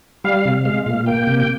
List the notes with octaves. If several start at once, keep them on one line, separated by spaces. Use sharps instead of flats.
G3 F5
C3
G#3 F5
A#2 F5
A#3 G5
C3
G5